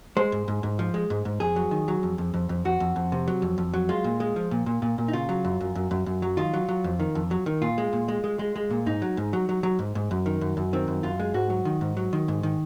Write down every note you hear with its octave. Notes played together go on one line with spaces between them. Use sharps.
G#3 C5
G#2
G#2
G#2
F3
G#3
G#2
G#2
F2 G#4
F#3
D#3
F#3
F2
F2
F2
F2
F2 F#4
F2
F2
C3
F#3
F2
F2
F#3
G#3 F4
A#2
G#3
F3
A#2
A#2
A#2
A#2
D#4
C#3 F4
F#3
F#2
F#2
F#2
F#2
F#2
F#3
D#3 F4
F#3
F#3
F2
D#3
F2
F#3
D#3
A#2 F4
G#3
A#2
G#3
G#3
G#3
G#3
A#2
G#2 D#4
F#3
G#2
F#3
F#3
F#3
G#2
G#2
F#2
D#3
F#2
F#2
D#3 C4
F#2
F#2 F4
G#3
G#2 F#4
F#3
D#3
G#2
F#3
D#3
G#2
D#3